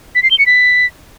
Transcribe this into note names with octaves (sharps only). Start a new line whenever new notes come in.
B6
C7
G7
C#7
B6